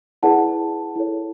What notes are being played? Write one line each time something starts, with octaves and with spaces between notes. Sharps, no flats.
E4 G#4 B4 D5 F#5 A5
E4 A4 C#5